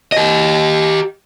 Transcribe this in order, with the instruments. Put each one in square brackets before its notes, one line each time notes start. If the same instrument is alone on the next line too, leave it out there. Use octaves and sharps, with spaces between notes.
[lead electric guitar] G4 D#5